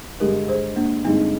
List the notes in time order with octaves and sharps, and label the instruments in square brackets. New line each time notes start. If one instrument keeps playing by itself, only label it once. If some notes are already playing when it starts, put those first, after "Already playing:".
[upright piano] G2 D3 G#3 [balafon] G4 A#4
[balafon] G#4 C5
A#3 D4
[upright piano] G2 D3 G#3 [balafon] C4 D#4